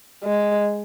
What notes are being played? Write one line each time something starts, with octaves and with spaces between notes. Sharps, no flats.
G#3